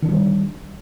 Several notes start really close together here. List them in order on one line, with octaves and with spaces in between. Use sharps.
D#3 D4 F3 G3